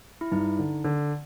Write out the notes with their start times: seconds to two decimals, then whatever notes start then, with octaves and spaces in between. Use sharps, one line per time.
0.21 E4
0.32 G2 D#4
0.59 D3
0.84 D3